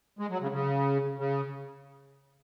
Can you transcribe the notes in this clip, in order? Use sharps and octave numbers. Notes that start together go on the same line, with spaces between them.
G#3
F#3
C#3
C#3
C#3